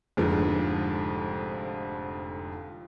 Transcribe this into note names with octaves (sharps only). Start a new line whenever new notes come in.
F1 F2 G#2 D3 F3